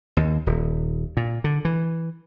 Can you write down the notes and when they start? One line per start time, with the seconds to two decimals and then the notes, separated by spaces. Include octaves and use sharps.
0.17 D#2
0.46 D#1
1.17 A#2
1.44 D3
1.65 E3